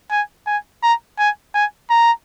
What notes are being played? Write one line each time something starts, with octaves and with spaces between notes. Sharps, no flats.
G#5
G#5
A#5
G#5
G#5
A#5